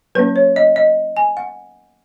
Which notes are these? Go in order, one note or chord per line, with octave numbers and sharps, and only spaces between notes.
F#3 A#3 C#4 B4
C#5
D#5
D#5
G#5
F#5